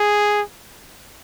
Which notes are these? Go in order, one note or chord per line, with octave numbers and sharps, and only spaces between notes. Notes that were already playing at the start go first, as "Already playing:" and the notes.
Already playing: G#4